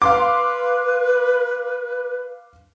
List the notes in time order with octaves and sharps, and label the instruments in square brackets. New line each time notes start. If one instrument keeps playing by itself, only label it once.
[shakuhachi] B4 [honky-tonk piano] F5 C6 D6